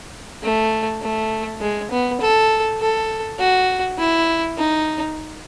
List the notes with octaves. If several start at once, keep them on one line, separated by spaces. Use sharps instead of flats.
A3
A3
G#3
B3
A4
A4
F#4
E4
D#4